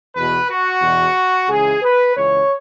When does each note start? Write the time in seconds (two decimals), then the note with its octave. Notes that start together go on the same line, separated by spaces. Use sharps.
0.15 E2 B2 B4
0.48 F#4
0.82 E2 B2
1.49 C#2 C#3 E3 G#4
1.82 B4
2.16 C#2 C#3 E3 C#5